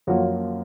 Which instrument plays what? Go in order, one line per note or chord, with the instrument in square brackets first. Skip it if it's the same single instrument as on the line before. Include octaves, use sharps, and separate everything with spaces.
[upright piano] F#2 F3 A#3 F#4